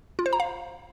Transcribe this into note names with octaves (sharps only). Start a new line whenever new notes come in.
F4
C5
A#5
F5